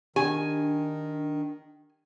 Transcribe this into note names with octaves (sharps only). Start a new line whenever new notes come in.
D#3 D4 G4 G#5